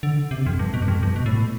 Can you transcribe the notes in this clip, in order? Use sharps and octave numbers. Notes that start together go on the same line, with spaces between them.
D3
C3
F2
G2
B2
G2
F2
G2
B2
A2